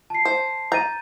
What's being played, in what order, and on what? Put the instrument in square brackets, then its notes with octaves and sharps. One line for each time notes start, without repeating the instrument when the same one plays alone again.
[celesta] A5 C7
[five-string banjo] C5
[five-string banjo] A#5 [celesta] G6 A6 D#7